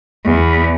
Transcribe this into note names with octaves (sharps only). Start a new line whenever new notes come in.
E2